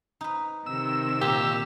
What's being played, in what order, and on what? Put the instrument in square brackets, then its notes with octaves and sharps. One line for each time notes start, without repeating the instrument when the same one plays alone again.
[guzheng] D#4 B4
[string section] C3 D#3 [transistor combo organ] E6
[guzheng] A#2 [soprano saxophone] G4